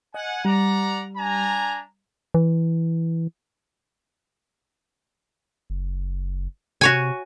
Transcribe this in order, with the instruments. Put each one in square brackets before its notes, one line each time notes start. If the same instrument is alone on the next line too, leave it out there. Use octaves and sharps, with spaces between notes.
[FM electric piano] D#5 [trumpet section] F#5 G#5
[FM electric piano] G3 [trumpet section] D5 F#5 A#5
[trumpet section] D4 G#5 A#5
[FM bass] E3
[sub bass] F#1
[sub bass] C3 [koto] F#4 C#5 G#5